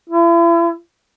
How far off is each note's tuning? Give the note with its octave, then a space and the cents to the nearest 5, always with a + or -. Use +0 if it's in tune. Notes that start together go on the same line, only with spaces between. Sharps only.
E4 +40